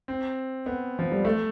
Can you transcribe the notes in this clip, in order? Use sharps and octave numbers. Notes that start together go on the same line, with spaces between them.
C4
B3
F3
G3
A3